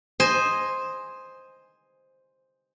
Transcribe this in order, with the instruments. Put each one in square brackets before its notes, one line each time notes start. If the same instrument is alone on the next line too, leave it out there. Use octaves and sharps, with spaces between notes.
[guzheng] C5 D#5 G#5